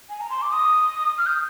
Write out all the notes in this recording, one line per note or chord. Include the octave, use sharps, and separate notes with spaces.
G#5
A#5
C6
D6
D#6
F6
G6